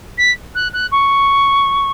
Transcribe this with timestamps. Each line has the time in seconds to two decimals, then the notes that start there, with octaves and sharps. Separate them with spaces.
0.18 B6
0.55 F#6
0.73 F#6
0.91 C#6